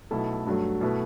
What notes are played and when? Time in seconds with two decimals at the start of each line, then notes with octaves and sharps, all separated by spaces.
0.11 B1 B2 A3 E4 A4
0.46 G2 F#3 A3
0.81 B2 A3 E4 B4